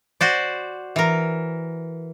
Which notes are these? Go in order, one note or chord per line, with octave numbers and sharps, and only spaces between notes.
F#4 C5 D5
E3 A#4